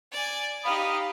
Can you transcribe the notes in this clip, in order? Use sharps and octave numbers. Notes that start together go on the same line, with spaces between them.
D5 G#5
D#4 G4 F5 B5 D#6